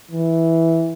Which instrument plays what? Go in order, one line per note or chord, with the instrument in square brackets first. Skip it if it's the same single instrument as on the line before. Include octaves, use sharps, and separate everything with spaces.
[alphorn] E3